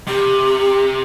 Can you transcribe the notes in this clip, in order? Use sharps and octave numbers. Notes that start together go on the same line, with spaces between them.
C3 G4